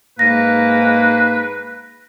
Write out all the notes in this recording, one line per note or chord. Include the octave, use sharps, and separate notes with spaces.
G#2 A#3 B4 A#6